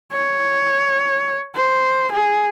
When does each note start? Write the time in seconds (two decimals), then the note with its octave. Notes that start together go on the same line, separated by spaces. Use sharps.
0.12 C#5
1.54 C5
2.11 G#4